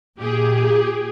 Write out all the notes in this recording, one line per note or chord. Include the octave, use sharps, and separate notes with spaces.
A#2 G4 G#4